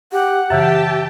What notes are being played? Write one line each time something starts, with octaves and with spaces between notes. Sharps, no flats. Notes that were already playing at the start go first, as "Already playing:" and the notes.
G4 F#5
F#2 C#3 E3 G4 E5 G5 A5